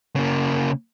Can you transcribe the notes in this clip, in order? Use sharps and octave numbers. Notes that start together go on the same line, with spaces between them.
C#3 A#3